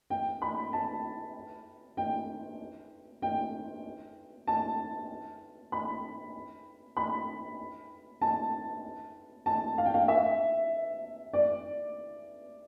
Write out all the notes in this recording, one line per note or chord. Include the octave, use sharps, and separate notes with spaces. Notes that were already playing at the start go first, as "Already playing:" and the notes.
G5
B5
A5
G5
G5
A5
B5
B5
A5
A5
F5
G5
F5
E5
D5